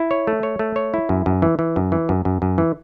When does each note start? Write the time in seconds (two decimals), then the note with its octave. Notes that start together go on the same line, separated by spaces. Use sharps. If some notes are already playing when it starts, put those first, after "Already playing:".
Already playing: E4
0.11 C#5
0.27 A3
0.43 C#5
0.59 A3
0.76 C#5
0.94 E4
1.09 F#2
1.26 F#2
1.42 E3
1.59 E3
1.76 F#2
1.92 E3
2.09 F#2
2.25 F#2
2.42 F#2
2.58 E3